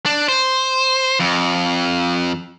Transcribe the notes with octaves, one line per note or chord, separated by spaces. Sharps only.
D4
C5
F2